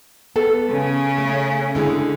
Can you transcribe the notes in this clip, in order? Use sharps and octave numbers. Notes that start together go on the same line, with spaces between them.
B3 A4
C#3 C#4
A3
D3 G#3 E4 G#4